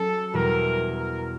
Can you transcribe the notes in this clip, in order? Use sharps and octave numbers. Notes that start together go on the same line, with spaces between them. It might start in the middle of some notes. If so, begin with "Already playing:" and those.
Already playing: F#3 C#4 A4
E2 B2 G3 A#4
A#4